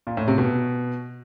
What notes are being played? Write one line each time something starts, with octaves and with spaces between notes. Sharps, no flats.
A#2
A2
C3
B2